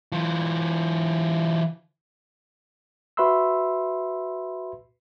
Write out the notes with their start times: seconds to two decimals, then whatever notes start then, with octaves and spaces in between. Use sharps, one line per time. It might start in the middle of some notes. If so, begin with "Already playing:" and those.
0.12 E3 F4
3.17 F#4 B4 E5 B5 C6 E6